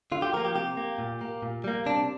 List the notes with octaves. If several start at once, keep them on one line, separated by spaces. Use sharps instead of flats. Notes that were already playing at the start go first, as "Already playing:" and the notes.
D3 F4
G4
F3 A#3 A#4
G4
C3 G4
A#3
A#2
A#3
A#2
G3 A#3
C3 D4